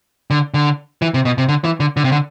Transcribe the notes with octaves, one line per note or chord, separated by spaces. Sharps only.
D3
D3
E3
C3
B2
C3
D3
E3
D3
D3
C3
D3